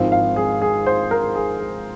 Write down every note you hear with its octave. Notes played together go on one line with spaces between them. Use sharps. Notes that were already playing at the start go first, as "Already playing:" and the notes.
Already playing: G#1 G#2 F3 C4 F5
F5
G#4
G#4
C5
A#4
G#4
G#4